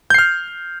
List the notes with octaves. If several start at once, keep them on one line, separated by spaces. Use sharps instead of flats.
F6 G6 C7